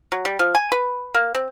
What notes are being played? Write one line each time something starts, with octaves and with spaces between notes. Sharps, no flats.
F#3
G3
F3
G#5
B4
A#3
C4